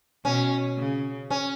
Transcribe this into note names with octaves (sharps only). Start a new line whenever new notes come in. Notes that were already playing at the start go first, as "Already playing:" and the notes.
B2 C#4
C#3
C#4